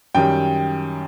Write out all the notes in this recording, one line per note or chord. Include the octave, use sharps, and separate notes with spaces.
F#2 D#3 G3 G5